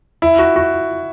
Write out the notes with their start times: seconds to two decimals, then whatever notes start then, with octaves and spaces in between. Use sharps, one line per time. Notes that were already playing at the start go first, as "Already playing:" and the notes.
0.22 E4
0.39 F#4
0.56 F#4